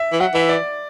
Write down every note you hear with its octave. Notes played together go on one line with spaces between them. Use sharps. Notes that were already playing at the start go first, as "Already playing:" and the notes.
Already playing: E5
E3
F#3 F#5
E3 E5
D5